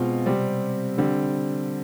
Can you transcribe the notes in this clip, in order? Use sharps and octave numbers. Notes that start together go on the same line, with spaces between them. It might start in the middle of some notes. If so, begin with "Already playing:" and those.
Already playing: B2 G#3 C4 F4
C3 G3 C4
D3 G3 C4